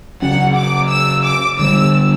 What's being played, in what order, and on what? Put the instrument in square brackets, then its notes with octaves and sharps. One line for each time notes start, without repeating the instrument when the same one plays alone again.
[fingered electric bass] C#3 F#3 C#4 [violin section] F#5
[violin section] D6
E6
D6
[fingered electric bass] D3 G3 B3 [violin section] E6